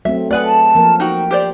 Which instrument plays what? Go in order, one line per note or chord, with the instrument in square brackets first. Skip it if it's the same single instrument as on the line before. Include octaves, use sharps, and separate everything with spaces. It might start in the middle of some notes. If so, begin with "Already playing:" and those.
[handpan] F#3 A3 C4 [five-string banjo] E5
[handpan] A3 F#5 [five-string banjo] G#4 B4 D5
[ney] A5
[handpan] F3 A#3 A#4
[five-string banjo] D#4 F#4 [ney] G5
[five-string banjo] G4 C5 D5